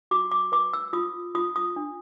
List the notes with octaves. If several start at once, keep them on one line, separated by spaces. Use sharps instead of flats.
F#4 D6
D6
B4 D6
E6
F4 D#6
F4 D#6
D#6
D4